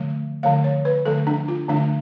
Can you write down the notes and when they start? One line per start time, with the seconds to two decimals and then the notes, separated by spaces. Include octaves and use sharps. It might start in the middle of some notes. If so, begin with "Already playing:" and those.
Already playing: D3 F3 A3
0.43 D3 F3 A3 F5
0.64 C#5
0.85 B4
1.05 D3 F3 A3 A4
1.27 D4
1.48 F4
1.68 D3 F3 A3 D4